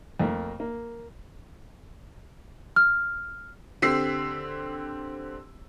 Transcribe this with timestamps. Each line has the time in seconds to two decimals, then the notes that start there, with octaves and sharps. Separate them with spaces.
0.20 F2 A3 A#3
0.60 A#3
2.76 F6
3.82 D3 C4 G4 E6 B6 C7